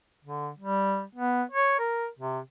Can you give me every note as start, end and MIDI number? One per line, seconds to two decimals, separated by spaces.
0.24 0.49 50
0.59 1.03 55
1.15 1.43 59
1.52 1.74 73
1.79 2.08 70
2.19 2.39 48